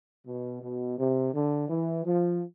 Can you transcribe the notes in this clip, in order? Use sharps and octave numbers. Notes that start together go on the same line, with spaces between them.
B2
B2
C3
D3
E3
F3